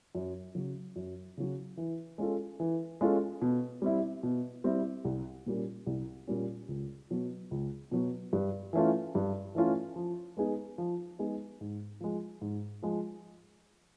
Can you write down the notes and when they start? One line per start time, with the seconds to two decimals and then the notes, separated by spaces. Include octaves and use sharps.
0.15 F#2
0.55 C#3 F#3
0.96 F#2
1.37 C#3 F#3
1.77 E3
2.18 G#3 C#4 F4 A4
2.60 E3
3.01 G#3 C#4 F4 A4
3.42 B2
3.82 G3 C4 E4
4.23 B2
4.64 G3 C4 E4
5.05 C2
5.46 A#2 G3 A#3 C#4
5.86 C2
6.27 A#2 G3 A#3 C#4
6.68 C#2
7.10 B2 F#3
7.51 C#2
7.91 B2 F#3
8.33 G2
8.73 E3 A3 C#4 F4
9.15 G2
9.55 E3 A3 C#4 F4
9.96 F3
10.37 G#3 B3 D#4 G#4
10.78 F3
11.19 G#3 B3 D#4 G#4
11.61 G#2
12.00 F3 G#3
12.41 G#2
12.82 F3 G#3